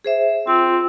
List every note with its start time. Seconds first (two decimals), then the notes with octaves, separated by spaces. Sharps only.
0.04 G#4 C5 E5
0.47 C4 F4